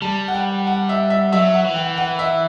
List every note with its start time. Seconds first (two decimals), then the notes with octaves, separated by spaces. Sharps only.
0.02 G3 A5
0.28 F#5
0.34 G5
0.67 F#5
0.89 E5
1.10 E5
1.32 F#3 E5
1.54 F#5
1.65 E3
1.76 G5
1.97 F#5
2.19 E5